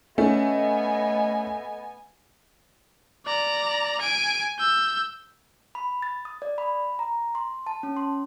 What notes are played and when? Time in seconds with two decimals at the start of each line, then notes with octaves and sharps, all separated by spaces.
0.18 A3 B3 C#4 D#5 G#5
3.26 D5 A#5
4.01 G#5 D7
4.59 E6 G6
5.75 B5
6.02 A6
6.25 D#6
6.42 D5
6.58 B5
6.99 A#5
7.35 C6
7.66 A5
7.83 C#4
7.96 C6